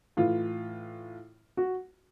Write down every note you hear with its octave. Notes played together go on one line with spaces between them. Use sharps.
A2 E3 F4
F#4